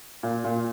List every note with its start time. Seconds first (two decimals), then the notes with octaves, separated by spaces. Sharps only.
0.23 A#2
0.44 A#2